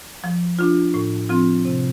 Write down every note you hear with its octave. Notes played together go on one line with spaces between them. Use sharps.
F3
D4 F4
A2
F3 C4 F4
C3